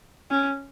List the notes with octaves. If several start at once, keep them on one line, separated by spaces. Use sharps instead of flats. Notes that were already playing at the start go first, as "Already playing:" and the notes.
C#4